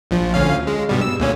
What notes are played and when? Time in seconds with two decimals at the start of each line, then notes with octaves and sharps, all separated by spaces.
0.11 A#1 F3
0.34 D2 C#4 F5
0.67 G#3
0.89 G2 B2 G3
1.01 E6
1.20 D2 A#2 C#4